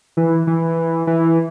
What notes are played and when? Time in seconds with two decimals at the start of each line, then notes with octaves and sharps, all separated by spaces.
0.17 E3
0.47 E3
1.07 E3